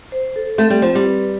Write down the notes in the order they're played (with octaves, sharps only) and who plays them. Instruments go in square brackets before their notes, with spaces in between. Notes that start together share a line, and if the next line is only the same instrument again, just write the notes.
[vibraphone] C5
A4
[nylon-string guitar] A3 [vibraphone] C4
[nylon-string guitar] G3
[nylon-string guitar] F3 [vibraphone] C4
[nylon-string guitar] G3
[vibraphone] B4